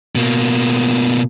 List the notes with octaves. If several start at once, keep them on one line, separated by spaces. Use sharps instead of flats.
B2 A#3